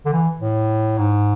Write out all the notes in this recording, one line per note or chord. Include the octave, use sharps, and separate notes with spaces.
D3
E3
A2
G#2